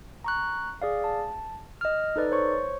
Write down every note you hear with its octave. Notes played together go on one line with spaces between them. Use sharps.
A#5 C#6 F#6
G#4 D5 F5
A5
D#5 F6
D#4 A4 B4 D5
C5 C#5 C#6